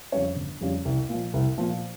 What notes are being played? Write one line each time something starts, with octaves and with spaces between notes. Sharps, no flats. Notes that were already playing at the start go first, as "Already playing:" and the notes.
F2 C#3 G3 C#4 C#5
G1
F2 C#3 G3 C#4
C2
A#2 F3
C2
A#2 F3